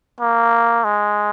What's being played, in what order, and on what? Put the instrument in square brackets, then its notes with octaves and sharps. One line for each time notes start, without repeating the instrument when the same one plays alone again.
[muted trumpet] A#3
G#3